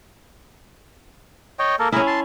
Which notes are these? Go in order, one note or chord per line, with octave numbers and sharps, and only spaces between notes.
C#5 D#5 G5
A#3 A4 A#4
C#4 E4 G#4 A#4
A5 C6